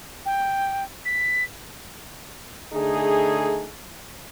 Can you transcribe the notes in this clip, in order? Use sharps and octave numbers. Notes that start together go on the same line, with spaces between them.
G5
B6
D3 A3 D#4 G#4